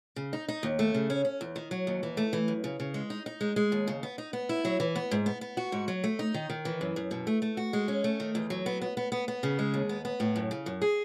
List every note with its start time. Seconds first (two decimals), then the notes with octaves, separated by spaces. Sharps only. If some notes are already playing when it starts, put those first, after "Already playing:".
0.16 C#3
0.33 D#4
0.48 D#4
0.63 D#2
0.79 A3
0.94 C#3
1.10 C#4
1.25 C#4
1.41 E2
1.56 D#3
1.71 F#3
1.87 D#2
2.03 E3
2.17 A3
2.33 E3
2.48 F#2
2.64 C#3
2.80 C#3
2.94 G#3
3.10 D#4
3.26 D#4
3.41 G#3
3.56 G#3
3.72 D#2
3.87 C#3
4.03 B3
4.18 D#4
4.33 B3
4.49 E4
4.65 F#3
4.80 E3
4.95 B3
5.11 G#2
5.26 B3
5.41 B3
5.57 F#4
5.72 G#2
5.88 F#3
6.04 A3
6.19 D#4
6.34 D#3
6.50 D#3
6.65 E3
6.81 F#2
6.96 F#2
7.11 B2
7.27 A3
7.42 A3
7.57 F#4
7.73 G#3
7.88 C#4
8.04 A3
8.20 D#3
8.35 E2
8.50 F#3
8.66 B3
8.81 B3
8.97 B3
9.12 B3
9.28 B3
9.43 C#3
9.59 G#3
9.74 D#2
9.89 B3
10.05 B3
10.20 A2
10.36 F#2
10.51 C#3
10.66 F#2
10.82 G#4